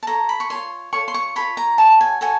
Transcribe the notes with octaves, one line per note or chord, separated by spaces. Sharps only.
A5
F4 A4 C#5 A#5
B5
C#6
F4 A4 C#5 C6
F4 A4 C#5 C#6
C6
C#6
F4 A4 C#5 B5
A#5
F#4 A4 C#5 A5
G#5
F#4 A4 C#5 G#5